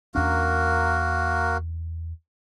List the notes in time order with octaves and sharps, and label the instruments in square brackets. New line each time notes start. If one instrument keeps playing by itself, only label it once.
[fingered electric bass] E2 C#4 D4 [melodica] A#3 F#4 A#4